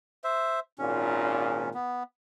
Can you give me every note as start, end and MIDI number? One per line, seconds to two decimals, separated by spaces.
0.24 0.60 72
0.24 0.60 76
0.78 1.70 32
0.78 1.70 46
0.78 1.70 61
1.74 2.03 59